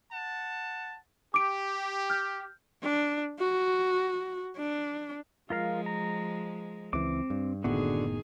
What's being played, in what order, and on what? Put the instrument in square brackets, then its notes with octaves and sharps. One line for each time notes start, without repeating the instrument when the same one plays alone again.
[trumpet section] F#5 A5
[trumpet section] G4 [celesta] D6 D7
[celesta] F6 G6
[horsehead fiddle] D4
F#4
D4
[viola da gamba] F3 G#3 [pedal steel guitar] F4 A#4 F5
[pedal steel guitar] A#5
[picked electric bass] C#2 E3 [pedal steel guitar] C4 D6
[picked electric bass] G2
[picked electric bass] F#1 A2 B3 [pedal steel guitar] D3 F#4 [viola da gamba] D#3 G#4